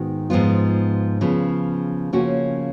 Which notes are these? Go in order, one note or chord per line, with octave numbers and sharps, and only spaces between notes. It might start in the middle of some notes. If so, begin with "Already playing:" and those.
Already playing: G#2 D#3 B3 F#4
G#2 F3 B3 F4
C#3 F3 B3
C#3 F3 A#3 C#4 F#4